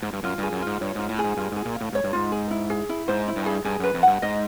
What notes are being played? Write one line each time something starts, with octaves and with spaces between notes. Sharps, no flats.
G#2
G2
F#2 F4
G2 G#4
F#2
G#2 F4
G2 C#5
G#2 F4
A2
G#4
G#2
G2 F4
G#2 G#4
A#2
F5
A2
G#2 C#5
G2
G#2 F4
G#4
E4
G#4
E4
G#2 C5
E4
G2
G#4
G2 G#4
F#2 B4
F2
G2 F#5
G#2 D#5